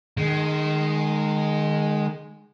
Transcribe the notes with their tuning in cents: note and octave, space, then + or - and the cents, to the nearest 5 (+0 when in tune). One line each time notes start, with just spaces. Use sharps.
D#3 -25 G#3 +0